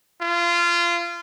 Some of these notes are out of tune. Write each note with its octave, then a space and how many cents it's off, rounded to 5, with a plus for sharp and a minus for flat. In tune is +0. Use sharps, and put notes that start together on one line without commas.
F4 -20